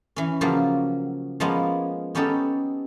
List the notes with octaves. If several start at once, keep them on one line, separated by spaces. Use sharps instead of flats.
E3 C#4
C#3 F3 F#3 A#3
F3 G#3 A#3 B3 C#4
B3 C#4 D#4 G4 A4